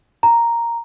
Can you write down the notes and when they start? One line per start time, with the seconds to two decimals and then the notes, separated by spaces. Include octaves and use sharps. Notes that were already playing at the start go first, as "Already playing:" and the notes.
0.23 A#5